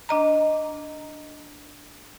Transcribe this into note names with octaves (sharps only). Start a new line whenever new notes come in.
D4 D#5 A#5